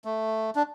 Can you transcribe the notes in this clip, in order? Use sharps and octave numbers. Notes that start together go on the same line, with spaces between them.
A3
D4